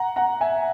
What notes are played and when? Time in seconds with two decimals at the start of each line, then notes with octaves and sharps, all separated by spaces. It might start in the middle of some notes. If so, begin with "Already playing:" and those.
Already playing: F#5 A#5
0.16 F#5 A#5
0.41 E5 G#5